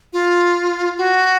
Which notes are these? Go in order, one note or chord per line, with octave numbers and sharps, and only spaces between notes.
F4
F#4